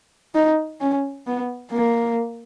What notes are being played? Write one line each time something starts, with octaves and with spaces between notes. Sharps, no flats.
D#4
C#4
B3
A#3